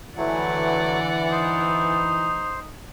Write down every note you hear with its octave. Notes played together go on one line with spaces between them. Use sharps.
D3 E3 F#3 A3 D5 F#5
D#4 C5